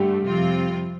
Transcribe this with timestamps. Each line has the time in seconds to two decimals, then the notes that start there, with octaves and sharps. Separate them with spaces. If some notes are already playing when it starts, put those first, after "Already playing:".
Already playing: G2 D3 G3 A3 G4
0.26 F2 C3 F3 C4 F4